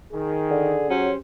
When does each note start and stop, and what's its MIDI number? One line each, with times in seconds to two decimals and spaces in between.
0.13 0.79 51
0.13 1.18 68
0.50 0.89 50
0.90 1.10 54
0.90 1.14 61
0.90 1.16 67
0.90 1.16 72